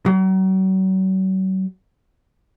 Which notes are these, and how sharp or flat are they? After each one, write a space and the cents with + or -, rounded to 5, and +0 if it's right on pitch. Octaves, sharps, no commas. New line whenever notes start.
F#3 +40